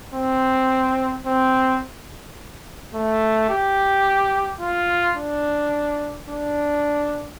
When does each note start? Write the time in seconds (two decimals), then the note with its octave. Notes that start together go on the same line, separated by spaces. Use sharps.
0.14 C4
1.27 C4
2.94 A3
3.50 G4
4.60 F4
5.17 D4
6.29 D4